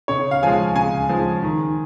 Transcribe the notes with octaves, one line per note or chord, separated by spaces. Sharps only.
C#3 C#5
F5
F3 G#3 G#5
C#3 G#5
F3 G#3
D#3